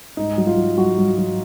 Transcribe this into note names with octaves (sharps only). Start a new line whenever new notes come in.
G#2 D#4
F#3
F4
F#3
F#3 F#4
F#3
F#3